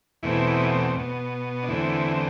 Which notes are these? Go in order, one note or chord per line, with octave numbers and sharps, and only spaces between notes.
E2 B2 A3 C4 E4
B2 B3
D4
E2 D3 A3 C4 E4